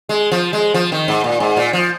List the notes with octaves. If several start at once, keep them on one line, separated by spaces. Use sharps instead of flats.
G#3
F3
G#3
F3
D#3
G#2
A#2
G#2
A#2
F3